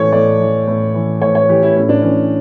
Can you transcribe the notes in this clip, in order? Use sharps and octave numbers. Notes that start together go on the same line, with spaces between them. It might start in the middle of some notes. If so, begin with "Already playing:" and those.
Already playing: A2 E3 A4 C#5
A2 D5
E3
A2
E3
A2 C#5
C#5
E3 G4
E4
A2 C#4
D4
E3 C#4